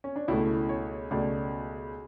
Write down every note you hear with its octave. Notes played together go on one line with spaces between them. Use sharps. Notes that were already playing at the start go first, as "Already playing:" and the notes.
C#4
D4
C#2 B2 A3 E4
C#5
C#2 B2 A3 D5